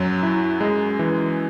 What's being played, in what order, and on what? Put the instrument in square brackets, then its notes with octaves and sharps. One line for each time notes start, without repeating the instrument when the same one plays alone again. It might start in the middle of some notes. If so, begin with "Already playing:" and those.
Already playing: [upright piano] F#2 [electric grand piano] F#3
[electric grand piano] E4
G#3
E3